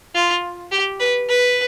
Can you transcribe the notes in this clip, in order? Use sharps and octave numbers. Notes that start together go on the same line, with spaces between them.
F4
G4
B4
B4